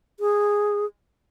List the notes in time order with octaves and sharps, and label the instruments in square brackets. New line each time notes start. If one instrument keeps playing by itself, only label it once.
[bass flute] G#4